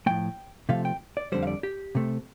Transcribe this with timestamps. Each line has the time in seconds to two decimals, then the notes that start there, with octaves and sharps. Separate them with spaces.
0.06 A2 F3 A3 G5
0.69 C3 F3 A3 F5
0.85 G5
1.17 D5
1.32 F2 D3 G3 C5
1.43 F5
1.47 D5
1.63 G4
1.95 C3 A3